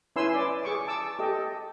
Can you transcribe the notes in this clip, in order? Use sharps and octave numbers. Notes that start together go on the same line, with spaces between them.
C#4 E4 B4 G#5 C6 E6
D5
G#4 C#6 D6
A5 D6 E6
G4 A4 D#5